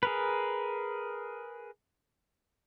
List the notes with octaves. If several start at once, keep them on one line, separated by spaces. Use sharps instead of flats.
G#4 A#4 B4